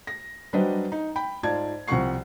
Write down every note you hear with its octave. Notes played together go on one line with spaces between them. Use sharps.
A#6
F#3 G3 D4 B4 C5 D#5
D#4
G5 B5
G#2 F4 D5 A5 G#6
C2 F3 C4 F#5 C#6 C7